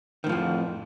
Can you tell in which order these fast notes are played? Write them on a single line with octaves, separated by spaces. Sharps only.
D#3 A2 F3 F2